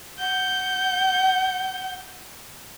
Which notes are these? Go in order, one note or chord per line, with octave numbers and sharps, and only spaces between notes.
F#5 G6